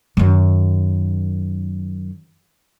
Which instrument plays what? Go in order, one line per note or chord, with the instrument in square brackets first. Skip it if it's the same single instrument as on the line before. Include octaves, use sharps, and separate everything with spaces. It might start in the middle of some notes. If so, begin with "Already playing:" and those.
[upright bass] F#2 D#3